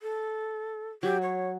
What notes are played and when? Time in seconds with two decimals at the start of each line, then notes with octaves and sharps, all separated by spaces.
0.02 A4
1.03 F#3 G4
1.22 C#5